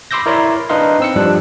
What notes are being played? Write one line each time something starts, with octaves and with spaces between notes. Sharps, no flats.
B5 C6 D6 E6 G6 A#6
E4 A#4 C#5 D5 B5 C6
D4 D#4 B4 D#5 F5 C6
C4 E6 C#7
G2 F3 G3 D4 F#6